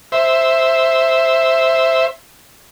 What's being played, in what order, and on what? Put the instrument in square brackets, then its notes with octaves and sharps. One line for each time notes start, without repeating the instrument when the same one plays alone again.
[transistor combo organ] C5 E5